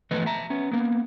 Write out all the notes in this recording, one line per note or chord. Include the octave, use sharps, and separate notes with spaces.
E3 F3 A3 B3 B4 D#5
E5 A5 A#5
B3 C#4
A#3 B3